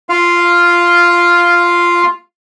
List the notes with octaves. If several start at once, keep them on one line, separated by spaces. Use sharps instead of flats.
F4 F5